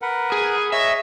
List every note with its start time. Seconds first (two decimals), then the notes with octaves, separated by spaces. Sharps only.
0.02 A#4 B4 F#5
0.32 G#4
0.72 C#5 D#5 E5